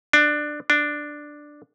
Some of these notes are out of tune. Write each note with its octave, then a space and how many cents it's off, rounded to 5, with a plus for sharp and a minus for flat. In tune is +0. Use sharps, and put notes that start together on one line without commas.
D4 +15
D4 +5